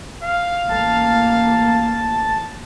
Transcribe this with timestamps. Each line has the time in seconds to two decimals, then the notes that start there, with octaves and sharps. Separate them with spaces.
0.24 F5
0.69 A1 A#3 A5